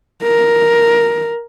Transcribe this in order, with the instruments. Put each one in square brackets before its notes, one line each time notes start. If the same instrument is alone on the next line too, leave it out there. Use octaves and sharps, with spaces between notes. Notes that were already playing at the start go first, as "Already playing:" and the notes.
[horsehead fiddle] A#4